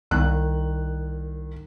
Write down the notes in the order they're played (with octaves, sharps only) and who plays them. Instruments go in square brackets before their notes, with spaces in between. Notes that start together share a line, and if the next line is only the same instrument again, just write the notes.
[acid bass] C2 [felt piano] D#3 F#6